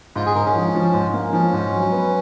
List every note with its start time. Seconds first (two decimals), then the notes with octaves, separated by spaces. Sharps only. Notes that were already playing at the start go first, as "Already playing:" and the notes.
0.16 G#2 F4
0.26 G#4
0.35 G#2 A#4
0.45 C#4
0.55 F3
0.75 F3
0.94 G#2
1.13 A#3
1.33 F3 C#4
1.53 G#2
1.73 F#3
1.92 B3